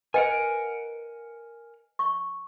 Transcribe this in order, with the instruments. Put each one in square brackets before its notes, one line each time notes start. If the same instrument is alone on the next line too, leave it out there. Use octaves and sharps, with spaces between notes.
[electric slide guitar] A#4 F#5 G#5 [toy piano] B4 D#5
[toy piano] C#6